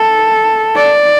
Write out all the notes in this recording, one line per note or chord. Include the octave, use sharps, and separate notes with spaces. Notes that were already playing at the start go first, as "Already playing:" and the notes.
Already playing: A4
D5